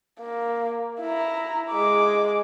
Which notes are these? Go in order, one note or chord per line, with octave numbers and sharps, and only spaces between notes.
A#3
E4 A#5
G#3 D6